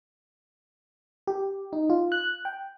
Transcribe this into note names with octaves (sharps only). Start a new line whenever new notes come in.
G4
D#4
F4
F#6
G5